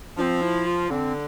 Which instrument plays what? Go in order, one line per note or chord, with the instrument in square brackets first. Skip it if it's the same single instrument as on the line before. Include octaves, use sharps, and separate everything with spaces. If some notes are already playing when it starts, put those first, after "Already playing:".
[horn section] F3 [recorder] C4 D4
[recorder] E4
F4
[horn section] D3 [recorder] C4